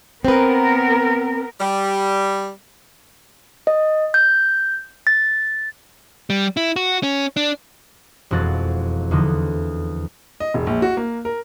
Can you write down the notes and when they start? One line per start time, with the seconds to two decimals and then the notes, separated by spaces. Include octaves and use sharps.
0.25 B3 C4 A#4 B4
1.60 G3
3.67 D#5
4.14 G6
5.07 A6
6.30 G3
6.57 E4
6.76 F#4
7.03 C#4
7.37 D4
8.31 E1 F2 F#4 A6
9.11 E2 D3 F3 D#4
10.40 D#5
10.54 E1
10.67 A#1
10.82 F#4
10.97 A#3
11.25 A#4